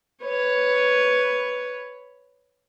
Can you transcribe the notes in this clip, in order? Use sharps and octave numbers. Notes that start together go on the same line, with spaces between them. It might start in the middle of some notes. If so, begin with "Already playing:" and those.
B4 C#5